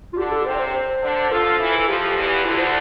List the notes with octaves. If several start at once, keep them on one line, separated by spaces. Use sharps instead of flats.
F4
D3 D4 G4
A4
C3 C4 C5
D5
C5
C5
D3 D4
F3 F4 A4
E3 E4
A4
F2 F3 G4
E2 E3
D2 D3 E4
C5